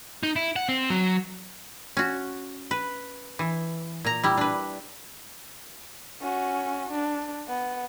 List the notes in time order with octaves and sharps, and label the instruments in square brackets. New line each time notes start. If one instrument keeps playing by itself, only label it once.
[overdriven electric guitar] D#4
E4
F#5
C4
F#3
[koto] C#4 F#4
B4
E3
A#2 A#5
G3 E4
D4 B4
[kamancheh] C#4 F#4
D4
B3